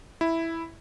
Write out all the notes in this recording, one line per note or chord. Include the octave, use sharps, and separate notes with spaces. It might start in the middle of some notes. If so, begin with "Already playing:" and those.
E4